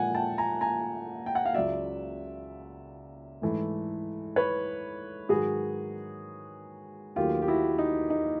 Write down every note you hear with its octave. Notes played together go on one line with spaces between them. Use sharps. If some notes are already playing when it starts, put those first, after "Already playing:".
Already playing: A#2 F3 G#3 F#5 G#5
G5 A5
G#5 A#5
G#5 A#5
G5
F#5
F5
C#2 C#3 F#3 D5 E5
G#2 E3 A3
B4 C#5
G#2 D#3 F#3 F#4 G#4
D#2 D#3 F#3 A3 F4 G4
G4
E4 F#4
D#4
D#4